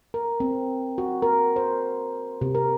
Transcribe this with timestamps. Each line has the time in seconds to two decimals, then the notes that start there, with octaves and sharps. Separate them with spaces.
0.14 A#4
0.40 C4
0.98 F#4
1.22 A#4
1.56 C5
2.41 C3
2.55 A#4